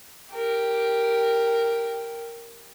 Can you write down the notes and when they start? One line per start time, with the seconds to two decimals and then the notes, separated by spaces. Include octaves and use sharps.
0.31 G4 A#4